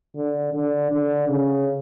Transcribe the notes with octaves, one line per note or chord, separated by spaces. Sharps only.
D3
D3
D3
C#3